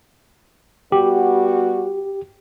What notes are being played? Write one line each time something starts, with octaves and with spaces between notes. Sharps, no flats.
G3 B3 F#4 G4